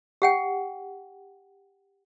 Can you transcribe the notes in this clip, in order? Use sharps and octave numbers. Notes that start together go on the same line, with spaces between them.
G4 F#5 G5